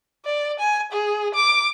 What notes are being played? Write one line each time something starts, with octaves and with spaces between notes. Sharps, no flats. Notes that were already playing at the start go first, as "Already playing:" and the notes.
D5
G#5
G#4
D6